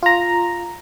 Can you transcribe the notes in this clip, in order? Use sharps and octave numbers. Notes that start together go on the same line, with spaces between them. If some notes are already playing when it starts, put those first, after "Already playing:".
F4 A#5